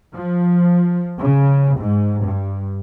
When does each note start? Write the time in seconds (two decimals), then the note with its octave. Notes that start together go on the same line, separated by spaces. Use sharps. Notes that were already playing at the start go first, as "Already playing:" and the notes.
0.17 F3
1.19 C#3
1.79 G#2
2.23 G2